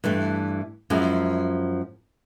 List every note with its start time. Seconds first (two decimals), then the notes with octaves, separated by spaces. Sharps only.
0.04 G2 E3 A3
0.90 F#2 F3 G#3 E4